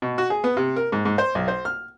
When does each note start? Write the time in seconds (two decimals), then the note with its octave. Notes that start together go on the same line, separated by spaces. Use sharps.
0.02 B2
0.18 F#4
0.30 G#4
0.44 B3
0.57 C3
0.76 A#4
0.92 G#2
1.05 G#2
1.18 C5
1.35 B1
1.48 C5
1.65 F6